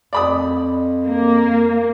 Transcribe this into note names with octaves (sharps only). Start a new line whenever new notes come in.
F2 D5 B5 D#6
A#3